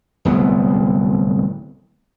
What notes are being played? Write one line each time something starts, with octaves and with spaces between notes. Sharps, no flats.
D1 C2 B3